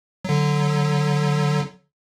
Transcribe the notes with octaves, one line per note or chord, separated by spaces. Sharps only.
D3 F#3